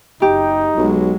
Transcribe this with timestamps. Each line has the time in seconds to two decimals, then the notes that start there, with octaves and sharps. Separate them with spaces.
0.22 F#1 D#4 G4
0.77 B1 F#3 G#3